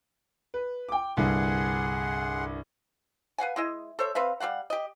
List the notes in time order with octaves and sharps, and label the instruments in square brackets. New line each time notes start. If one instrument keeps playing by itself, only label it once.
[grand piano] B4
G5 D6
[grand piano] C2 G2 D3 [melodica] G#4 F#5 C6
[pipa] B4 F5 F#5 G#5
G#3 E4 D#5
A4 C5 C#5 E5
C4 B4 E5 F5
G3 A#3 F5 F#5
G4 D#5